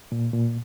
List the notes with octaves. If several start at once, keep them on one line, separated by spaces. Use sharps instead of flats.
A#2
A#2